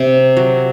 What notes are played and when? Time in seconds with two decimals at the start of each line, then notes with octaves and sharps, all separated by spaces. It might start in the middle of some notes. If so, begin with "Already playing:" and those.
Already playing: C3
0.37 F#3